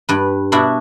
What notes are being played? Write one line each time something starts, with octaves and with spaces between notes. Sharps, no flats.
G2 B4
B2 D4 E4 F#4 B5